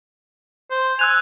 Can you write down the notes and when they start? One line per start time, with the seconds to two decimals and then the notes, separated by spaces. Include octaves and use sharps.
0.71 C5
0.99 G#5 E6 F#6 F7